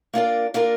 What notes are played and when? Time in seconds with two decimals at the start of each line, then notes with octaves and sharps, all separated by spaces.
0.13 A#3 D4 F4 A#4 D5
0.54 A#3 D4 F4 A#4 D5